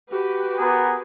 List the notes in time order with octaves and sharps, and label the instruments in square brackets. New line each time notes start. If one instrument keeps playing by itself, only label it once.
[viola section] F#4 G4 B4
[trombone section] B3 G#4 A#4